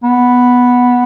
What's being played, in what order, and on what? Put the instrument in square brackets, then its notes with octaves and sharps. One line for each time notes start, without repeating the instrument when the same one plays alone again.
[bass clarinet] B3